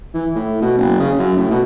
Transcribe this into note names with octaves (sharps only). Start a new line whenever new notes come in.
E3
A2
B2
F#1
C#3
F#2
A2
B2